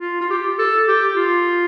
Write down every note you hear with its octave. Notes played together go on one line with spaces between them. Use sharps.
F4
F4
G4
A4
G4
F4